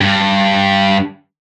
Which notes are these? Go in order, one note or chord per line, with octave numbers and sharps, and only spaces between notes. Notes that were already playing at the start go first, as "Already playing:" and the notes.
G2